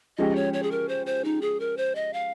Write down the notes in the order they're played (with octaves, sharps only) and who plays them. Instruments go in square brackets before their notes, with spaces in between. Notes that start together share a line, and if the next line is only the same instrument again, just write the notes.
[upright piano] F3 G#3 C#4 G4 [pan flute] D#5
[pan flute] C#5
C#5
G#4
A#4
C5
C5
D#4
G#4
A#4
C5
D#5
F5